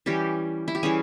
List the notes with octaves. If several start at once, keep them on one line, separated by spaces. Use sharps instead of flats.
E3 G3 C#4 G4
E4
G4
E3 G3 C#4 G#4